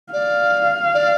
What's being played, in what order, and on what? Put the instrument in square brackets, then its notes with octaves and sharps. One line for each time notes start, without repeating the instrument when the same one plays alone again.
[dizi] D5 [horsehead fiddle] F5
[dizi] D5